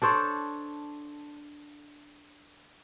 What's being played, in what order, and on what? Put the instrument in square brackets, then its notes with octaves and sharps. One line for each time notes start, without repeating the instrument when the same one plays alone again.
[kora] D4 A4 C5 C#5